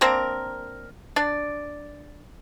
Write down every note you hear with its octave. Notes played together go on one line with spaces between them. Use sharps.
A#3 C4 D4 A#4
D4 D5